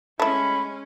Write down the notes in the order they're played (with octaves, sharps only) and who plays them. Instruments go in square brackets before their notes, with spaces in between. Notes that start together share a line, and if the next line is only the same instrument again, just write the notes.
[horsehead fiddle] G#3 C#4 [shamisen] A3 E4 [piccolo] B5